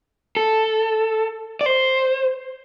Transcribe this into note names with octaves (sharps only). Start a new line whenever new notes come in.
A4
D5
C5